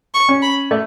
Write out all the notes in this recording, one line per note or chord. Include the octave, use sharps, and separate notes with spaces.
C#6
C#4
B5
A3